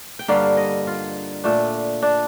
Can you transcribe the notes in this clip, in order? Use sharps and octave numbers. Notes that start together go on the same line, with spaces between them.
G5
G2 D3 G3 A#3 F5
D#5
F4
A#2 A3 D4
D4